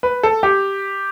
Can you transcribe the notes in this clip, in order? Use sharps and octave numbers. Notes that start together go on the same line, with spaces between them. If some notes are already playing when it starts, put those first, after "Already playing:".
B4
A4
G4